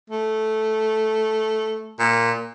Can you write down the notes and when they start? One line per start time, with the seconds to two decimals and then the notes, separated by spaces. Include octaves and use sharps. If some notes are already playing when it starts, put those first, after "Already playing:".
0.10 A3
1.99 A#2